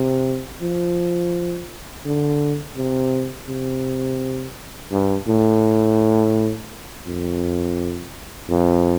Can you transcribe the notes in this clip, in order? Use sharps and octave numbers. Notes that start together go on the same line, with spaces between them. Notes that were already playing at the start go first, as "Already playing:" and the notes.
Already playing: C3
F3
D3
C3
C3
G2
A2
F2
F2